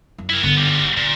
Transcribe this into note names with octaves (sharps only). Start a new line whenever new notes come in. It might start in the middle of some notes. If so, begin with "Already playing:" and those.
F#2
E4 A#4
G1 D3 B3
G#2 G3
A#2 D3